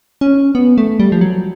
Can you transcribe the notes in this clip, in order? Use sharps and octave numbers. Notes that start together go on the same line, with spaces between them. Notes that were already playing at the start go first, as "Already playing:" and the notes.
C#4
B3
A3
G3
F3
F#3